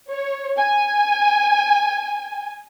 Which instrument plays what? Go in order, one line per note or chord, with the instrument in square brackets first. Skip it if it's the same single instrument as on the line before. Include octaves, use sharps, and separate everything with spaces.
[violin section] C#5
G#5